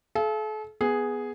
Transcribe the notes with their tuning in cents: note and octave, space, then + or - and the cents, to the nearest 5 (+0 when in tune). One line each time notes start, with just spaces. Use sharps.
A4 -40 F5 -45
B3 +0 G#4 +0